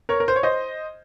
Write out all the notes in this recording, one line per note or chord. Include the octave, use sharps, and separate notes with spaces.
A#4 C#5
A#4
C5
C#5
C5 D#5